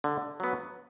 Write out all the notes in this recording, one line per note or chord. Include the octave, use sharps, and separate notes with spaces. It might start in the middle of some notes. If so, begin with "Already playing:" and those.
D3
F#3 B3